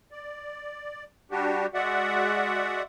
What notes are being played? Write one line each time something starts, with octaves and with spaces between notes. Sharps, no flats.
D5
G3 D4 F#4 G4
G#3 F#4 D5 E5 F#5